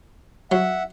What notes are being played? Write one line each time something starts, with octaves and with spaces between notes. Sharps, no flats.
F#3 E5 F#5